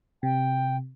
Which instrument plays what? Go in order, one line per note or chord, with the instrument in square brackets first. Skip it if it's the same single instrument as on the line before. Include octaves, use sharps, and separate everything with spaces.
[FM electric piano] C3 [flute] G5